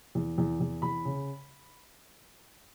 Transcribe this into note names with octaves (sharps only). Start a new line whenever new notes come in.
E2
E2
E2
E2 B5
C#3